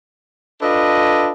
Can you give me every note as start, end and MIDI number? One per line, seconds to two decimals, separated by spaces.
0.62 1.32 62
0.62 1.32 65
0.62 1.32 69
0.62 1.32 71
0.62 1.32 75